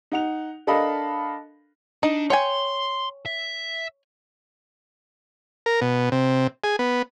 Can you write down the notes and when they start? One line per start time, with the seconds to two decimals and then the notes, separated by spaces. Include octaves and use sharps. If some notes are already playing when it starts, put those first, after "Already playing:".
0.12 D#4 F#5 F7
0.67 D4 A4 A#4 D#5 F5 B5
2.03 D4 D#4
2.30 C#5 G5 G#5 C6
3.26 E5
5.66 A#4
5.81 B2
6.12 C3
6.64 G#4
6.79 B3